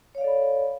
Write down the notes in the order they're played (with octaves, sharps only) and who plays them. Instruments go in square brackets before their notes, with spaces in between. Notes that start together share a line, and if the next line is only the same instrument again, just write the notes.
[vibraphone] C#5
F5
D5
A4
B5